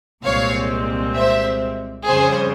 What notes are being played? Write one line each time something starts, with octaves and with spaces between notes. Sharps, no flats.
C2 A#2 G#3 C4 C#5 F5
C5 E5
F2 C#3 G3 C#4 G#4 C5